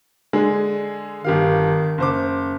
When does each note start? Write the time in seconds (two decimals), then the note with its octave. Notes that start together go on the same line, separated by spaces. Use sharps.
0.33 D3 G#3 G#4
1.24 G1 D#3 G4 F5
1.98 F#1 C5 D6